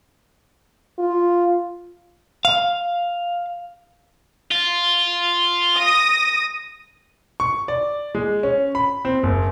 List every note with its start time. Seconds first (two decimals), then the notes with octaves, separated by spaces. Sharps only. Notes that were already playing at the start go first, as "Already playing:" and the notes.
0.99 F4
2.45 F5
4.51 F4
5.76 D#6 A#6
7.40 C#6
7.68 D5
8.15 G#3
8.43 C#4
8.75 B5
9.05 C4
9.23 F#1